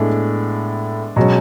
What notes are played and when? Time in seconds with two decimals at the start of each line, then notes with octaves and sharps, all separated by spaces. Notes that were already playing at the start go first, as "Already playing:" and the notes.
Already playing: A2 G#3 A3 B3 D4
1.16 B2 F#3 G#3 C#4